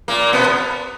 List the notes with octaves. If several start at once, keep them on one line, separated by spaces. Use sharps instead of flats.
A#2 A#3
B2 B3